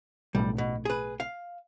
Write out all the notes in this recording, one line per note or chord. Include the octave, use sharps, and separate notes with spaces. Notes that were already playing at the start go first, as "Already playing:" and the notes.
B1 A2 G3
B2
G#4 B4
F5